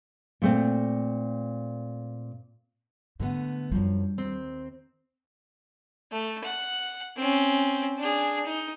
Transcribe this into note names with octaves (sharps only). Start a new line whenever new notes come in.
A#2 A3 C4
G#2 D3 A3 B3
F#2 F3 G3 D4
D#2 C4
A3
F#5
C4 C#4
D4 G#4
D#4